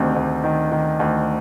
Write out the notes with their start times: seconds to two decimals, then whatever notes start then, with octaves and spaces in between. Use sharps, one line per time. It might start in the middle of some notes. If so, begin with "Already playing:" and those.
Already playing: D2 C3 D#3
0.16 D2
0.44 D#3
0.72 D#3
1.00 D2